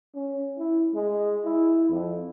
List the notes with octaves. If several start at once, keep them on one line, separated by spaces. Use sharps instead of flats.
C#4
E4
G#3
E4
F2